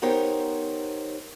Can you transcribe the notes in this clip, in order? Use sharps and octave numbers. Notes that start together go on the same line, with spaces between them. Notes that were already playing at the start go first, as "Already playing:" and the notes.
B3 D#4 G4 A#4 C5 C#5